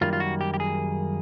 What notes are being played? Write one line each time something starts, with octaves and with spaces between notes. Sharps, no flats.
F#2 D#3 G3 A#3 F4
F4
F#4
G4
G4
G#4